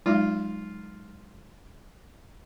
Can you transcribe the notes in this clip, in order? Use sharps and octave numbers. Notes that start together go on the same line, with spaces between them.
F#3 G#3 D#4 F4